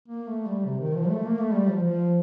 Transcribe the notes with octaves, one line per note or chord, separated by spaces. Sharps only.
A#3
A3
G3
C3
D#3
F3
A3
A#3
A3
G3
F3
F3